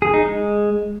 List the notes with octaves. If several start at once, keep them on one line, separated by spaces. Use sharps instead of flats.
G#4
D#4
G#3